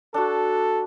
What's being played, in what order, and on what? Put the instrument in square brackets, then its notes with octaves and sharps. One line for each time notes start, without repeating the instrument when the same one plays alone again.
[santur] D4 F#4 [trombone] A4